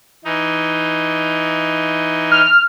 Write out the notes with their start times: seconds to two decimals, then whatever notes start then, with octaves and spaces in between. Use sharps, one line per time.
0.25 E3 D#4
2.32 F6